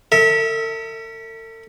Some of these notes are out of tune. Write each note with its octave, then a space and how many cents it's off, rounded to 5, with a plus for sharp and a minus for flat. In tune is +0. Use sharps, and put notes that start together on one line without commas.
A4 +40 E5 -30